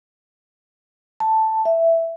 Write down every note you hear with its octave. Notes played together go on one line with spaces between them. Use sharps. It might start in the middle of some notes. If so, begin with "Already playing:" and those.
A5
E5